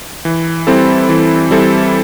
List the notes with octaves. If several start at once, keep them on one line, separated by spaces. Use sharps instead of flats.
E3
G3 C4 E4 A4
E3
G3 C4 E4 A4